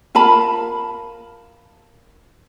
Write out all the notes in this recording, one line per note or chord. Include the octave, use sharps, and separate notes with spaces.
F4 A#4 A5 B5